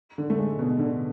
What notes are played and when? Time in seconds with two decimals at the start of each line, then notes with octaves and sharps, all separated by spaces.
0.18 D3
0.30 A3
0.39 G#3
0.59 B2
0.79 D3